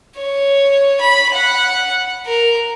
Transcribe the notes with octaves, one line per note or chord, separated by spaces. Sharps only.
C#5
B5
F#5
A#4